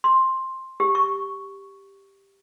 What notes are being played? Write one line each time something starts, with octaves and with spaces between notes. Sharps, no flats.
C6
G4
C#6